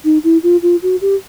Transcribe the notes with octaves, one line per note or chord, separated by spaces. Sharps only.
D#4
E4
F4
F4
F#4
G4